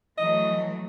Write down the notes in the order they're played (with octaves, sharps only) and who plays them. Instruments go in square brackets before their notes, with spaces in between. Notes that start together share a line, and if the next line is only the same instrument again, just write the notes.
[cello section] E3 F#3 A3 [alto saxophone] D#5